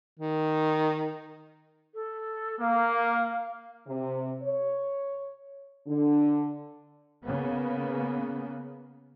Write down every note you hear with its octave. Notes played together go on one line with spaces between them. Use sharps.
D#3
A4
A#3 F5
C3
C#5
D3
C#3 A#3 B3